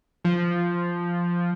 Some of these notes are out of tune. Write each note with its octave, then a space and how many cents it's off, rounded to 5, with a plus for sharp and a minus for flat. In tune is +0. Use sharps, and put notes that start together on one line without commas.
F3 -5